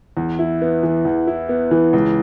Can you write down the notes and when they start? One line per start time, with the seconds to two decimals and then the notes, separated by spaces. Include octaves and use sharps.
0.17 E2
0.39 E4
0.61 B3
0.83 E3
1.05 E2
1.27 E4
1.49 B3
1.71 E3
1.93 C#2